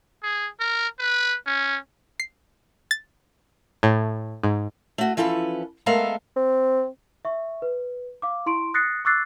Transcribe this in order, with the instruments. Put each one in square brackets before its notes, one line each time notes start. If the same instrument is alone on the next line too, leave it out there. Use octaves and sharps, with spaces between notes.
[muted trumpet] G#4
A#4
B4
C#4
[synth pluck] C7
A6
A2
G#2
[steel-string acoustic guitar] A3 F#4
E3 F3 C#4 A4 B4
G#3 A3 B3 A4 A#4 F5
[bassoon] C4
[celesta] E5 C#6
B4
F5 D6
E4 C6 C#6 D7
D#6 F#6 A6 A#6 C7 C#7
C#6 D6 E6 F#6 A6 C7